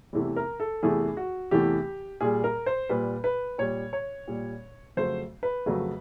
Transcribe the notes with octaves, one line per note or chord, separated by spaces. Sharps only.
E2 C3 E3 A3
A#4
A4
E2 C3 E3 A3 G#4
F#4
E2 C3 E3 A3 G4
A#2 G3 G#4
A#4
C5
A#2 G3 B4
B4
A#2 G3 C#5
C#5
A#2 G3
F2 C#3 F#3 A3 C5
B4
F2 C#3 F#3 A3